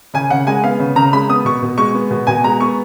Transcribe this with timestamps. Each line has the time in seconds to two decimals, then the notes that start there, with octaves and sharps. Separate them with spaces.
0.14 C#3 G#5
0.30 C#3 F#5
0.47 G#3 G#5
0.63 B3 F5
0.80 C#3
0.96 C#3 A#5
1.13 G#3 B5
1.29 B3 D#6
1.45 B2 C#6
1.62 B2
1.78 G#3 C#6
1.94 B3
2.11 B2
2.27 B2 G#5
2.44 G#3 A#5
2.60 B3 C#6